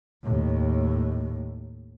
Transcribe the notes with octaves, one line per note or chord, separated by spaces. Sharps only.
D#2 A2